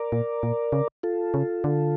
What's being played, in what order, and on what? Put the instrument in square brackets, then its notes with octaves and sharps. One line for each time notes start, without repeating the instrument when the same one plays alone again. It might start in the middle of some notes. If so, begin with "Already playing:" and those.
Already playing: [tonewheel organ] A#4 D5
[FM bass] A#2
A#2
C#3
[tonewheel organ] F4 A4
[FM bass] C#3
D3